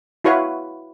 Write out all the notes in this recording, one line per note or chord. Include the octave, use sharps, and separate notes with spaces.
E4 F#4 B4 C#5 F5